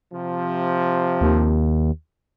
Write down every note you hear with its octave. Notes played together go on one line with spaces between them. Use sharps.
C3 F3
D#2